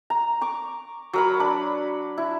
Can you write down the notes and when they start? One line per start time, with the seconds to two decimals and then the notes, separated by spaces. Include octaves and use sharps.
0.10 A#5
0.41 C#6 D6
1.13 F#3 A#4 B5
1.40 D4 B5
2.18 E4